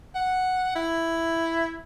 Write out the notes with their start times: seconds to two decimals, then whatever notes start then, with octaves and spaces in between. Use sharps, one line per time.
0.15 F#5
0.75 E4